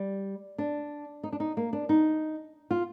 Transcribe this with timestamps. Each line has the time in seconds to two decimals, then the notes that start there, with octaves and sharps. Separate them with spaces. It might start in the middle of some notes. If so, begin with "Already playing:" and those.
Already playing: G3
0.58 D4
1.24 D#4
1.32 D4
1.40 D#4
1.57 A#3
1.73 D4
1.89 D#4
2.71 F4